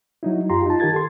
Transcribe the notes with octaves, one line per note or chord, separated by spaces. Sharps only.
F#3 D#4 E4
F#2 F4 G4 A#5 C6
D#4 F4 A5
D#3 G4 A#4 G#6 A6
A4 C6